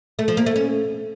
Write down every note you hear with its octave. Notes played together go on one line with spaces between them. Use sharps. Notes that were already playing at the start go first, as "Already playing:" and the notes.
A3
F3
A#3
A3
C#4